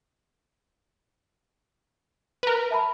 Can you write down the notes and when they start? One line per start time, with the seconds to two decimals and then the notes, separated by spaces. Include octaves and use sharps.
2.43 A#4 B4
2.71 E5 A5 B5